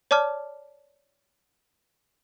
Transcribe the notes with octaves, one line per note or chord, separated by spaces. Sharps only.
C#5 D5 A5 D6 F6